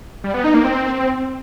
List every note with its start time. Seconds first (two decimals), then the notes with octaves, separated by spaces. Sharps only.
0.24 G3
0.34 B3
0.44 D#4
0.54 A#3
0.64 C4